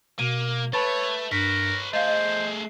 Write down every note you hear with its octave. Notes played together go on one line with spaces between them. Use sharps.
B2 A#3 D#7
A3 B4 C#5 A5 B5 A6
G2 A#4 B4 C#5 B6
A3 G#4 C5 D#5 F5 C7
D#5